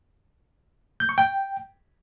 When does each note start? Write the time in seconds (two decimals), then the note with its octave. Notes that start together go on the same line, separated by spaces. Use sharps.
1.00 G6
1.09 C#6
1.18 G5